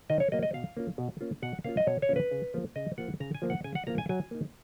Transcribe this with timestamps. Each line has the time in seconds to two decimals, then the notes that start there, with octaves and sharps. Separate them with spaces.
0.10 D#3 D#5
0.20 C#5
0.32 F#3 A#3 D#5
0.43 D#5
0.53 B2 F5
0.77 A#3 C#4 F4
0.98 B2
1.21 A#3 C#4 F4
1.42 B2 F#5
1.64 A#3 C#4 F4 F5
1.77 D#5
1.87 B2 C#5
2.02 C#5
2.09 A#3 C#4 F4
2.16 B4
2.31 C#3
2.54 F3 A#3 F4
2.76 C#3 D#5
2.98 F3 A#3 F4 F#5
3.20 C#3 A#5
3.35 G#5
3.42 F3 A#3 F4
3.50 F#5
3.64 C#3 G#5
3.75 F#5
3.87 F3 A#3 F4 A#5
3.98 G#5
4.09 F#3 G#5
4.31 A#3 D#4